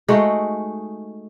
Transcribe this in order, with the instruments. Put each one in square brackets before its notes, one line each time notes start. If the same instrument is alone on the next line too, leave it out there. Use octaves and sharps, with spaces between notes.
[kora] G#3 A3 D#4 F#4